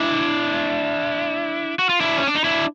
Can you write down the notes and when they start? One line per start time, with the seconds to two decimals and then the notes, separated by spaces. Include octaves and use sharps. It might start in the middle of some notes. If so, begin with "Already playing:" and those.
Already playing: D4 E4
1.79 F#4
1.89 F4
2.01 D4 E4
2.18 C#4
2.27 D4
2.36 D#4
2.45 D4 E4